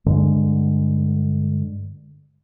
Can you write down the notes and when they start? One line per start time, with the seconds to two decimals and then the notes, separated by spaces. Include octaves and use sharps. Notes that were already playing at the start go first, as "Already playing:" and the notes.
0.06 G2 D3 G#3